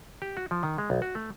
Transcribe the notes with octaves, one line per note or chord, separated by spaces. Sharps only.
G4
F#4
F3
D#3
G#3
B1
F#4
A3